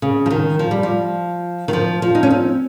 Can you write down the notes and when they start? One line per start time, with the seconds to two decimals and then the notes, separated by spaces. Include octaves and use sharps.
0.02 C#3
0.26 F3
0.30 D#3
0.59 F3
0.71 G3
0.83 F3
1.68 D#3
1.73 F3
2.02 F3
2.15 D#4
2.23 C#4
2.31 C4